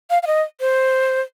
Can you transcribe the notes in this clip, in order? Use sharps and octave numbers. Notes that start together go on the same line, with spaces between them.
F5
F5
D#5
C5